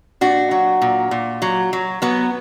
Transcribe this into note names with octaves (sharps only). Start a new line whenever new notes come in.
A#2 D4 F#4
F#3
A#2
A#2
F#3
F#3
F#3 B3